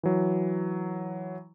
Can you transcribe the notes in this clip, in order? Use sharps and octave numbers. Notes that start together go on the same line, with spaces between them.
E3 F#3